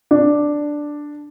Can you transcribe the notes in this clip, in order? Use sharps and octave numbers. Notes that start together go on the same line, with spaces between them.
D4